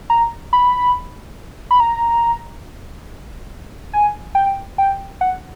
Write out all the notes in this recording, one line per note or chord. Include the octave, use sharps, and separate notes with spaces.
A#5
B5
B5
A#5
G#5
G5
G5
F#5